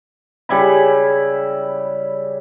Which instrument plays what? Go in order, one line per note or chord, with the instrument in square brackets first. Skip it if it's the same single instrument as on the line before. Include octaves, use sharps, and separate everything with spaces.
[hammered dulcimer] C#3 G3 E4 B5